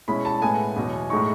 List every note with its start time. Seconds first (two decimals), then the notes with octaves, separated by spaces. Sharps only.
0.08 B2 G#3 C#4 E4 B5
0.25 A5
0.42 A2 G#3 B3 G#5
0.76 E2 B2 F#3
1.10 A2 G#3 D#4 C#6